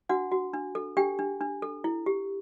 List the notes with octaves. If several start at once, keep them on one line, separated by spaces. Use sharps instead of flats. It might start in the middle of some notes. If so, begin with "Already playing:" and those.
D4 F#4 F#5
F#4
D4
A4
D4 G4 G5
D4
D4
A4
E4
G4